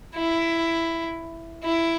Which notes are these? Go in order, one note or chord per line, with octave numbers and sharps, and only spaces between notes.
E4
E4